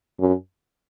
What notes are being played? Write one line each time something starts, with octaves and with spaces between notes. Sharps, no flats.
F#2